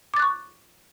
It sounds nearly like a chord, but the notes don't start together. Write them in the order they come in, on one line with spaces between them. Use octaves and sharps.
D6 A6 F#6 C#6